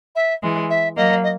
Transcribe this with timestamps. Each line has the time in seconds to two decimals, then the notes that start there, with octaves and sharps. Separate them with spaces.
0.15 E5
0.42 E3 G#3
0.69 E5
0.96 F#3 A#3 D#5
1.23 D#5